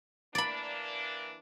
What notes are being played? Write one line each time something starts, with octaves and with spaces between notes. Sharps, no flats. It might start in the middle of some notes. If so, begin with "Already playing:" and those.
E3 A#3 D4 D5 B5